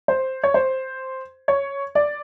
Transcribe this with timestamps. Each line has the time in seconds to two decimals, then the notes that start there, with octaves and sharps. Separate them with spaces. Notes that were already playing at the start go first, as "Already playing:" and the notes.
0.08 C5
0.43 C#5
0.54 C5
1.48 C#5
1.95 D5